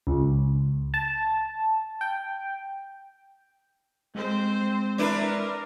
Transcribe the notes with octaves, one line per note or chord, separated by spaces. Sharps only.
C#2
A5
G5
G#3 C4 C5
D4 E4 A#4 B4